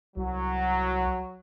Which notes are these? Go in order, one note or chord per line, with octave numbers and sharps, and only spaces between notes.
C2 F#3